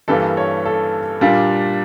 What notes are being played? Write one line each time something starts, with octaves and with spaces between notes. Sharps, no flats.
G2 E3 G3 A#3 A4
C#5
A4
A#2 G3 A#3 D4 F4